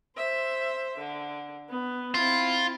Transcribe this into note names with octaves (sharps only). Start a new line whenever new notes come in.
C5 E5
D3
B3
C4 E4 F4